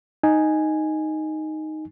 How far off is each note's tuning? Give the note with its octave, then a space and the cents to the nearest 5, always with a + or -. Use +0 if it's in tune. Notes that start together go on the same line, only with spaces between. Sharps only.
D#4 +0 G#5 +0